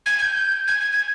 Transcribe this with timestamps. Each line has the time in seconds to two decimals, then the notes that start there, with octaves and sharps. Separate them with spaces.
0.06 G#6
0.19 G#6
0.22 G6
0.68 G#6
0.80 G#6
0.92 G#6